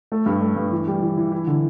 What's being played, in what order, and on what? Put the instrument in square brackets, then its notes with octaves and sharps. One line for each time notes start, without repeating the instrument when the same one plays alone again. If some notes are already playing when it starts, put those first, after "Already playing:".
[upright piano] A3
G2
A3
G2
E3
G3
E3
E3
E4
D3